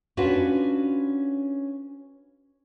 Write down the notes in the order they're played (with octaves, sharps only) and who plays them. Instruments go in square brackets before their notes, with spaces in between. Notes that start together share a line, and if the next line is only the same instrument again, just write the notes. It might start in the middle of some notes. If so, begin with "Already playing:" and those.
[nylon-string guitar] C#4 D4 F4 F#4 B4